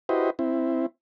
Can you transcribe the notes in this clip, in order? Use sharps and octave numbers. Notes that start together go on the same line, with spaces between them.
E4 F#4 G4 B4 C5 D#5
C4 E4